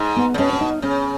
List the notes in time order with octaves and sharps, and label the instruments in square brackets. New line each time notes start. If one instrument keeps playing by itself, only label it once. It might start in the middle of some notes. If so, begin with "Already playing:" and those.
Already playing: [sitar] G#2
[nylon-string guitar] B3
[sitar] C#3
[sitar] B2 [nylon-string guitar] C#4
[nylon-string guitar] C#4
D#4
[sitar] C#3 [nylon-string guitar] C#4